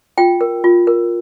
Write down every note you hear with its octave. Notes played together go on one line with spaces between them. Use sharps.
F4 G5
A#4
F4
A#4